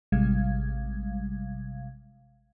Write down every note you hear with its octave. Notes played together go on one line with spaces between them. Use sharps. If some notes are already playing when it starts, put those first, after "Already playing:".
A1 C3 G3 G#3 F5 G#6